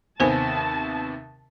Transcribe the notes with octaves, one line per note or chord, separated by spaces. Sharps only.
D#2 C3 B3 C5 G#5 A5